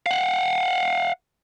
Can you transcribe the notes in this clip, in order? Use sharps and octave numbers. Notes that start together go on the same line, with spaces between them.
F5 F#5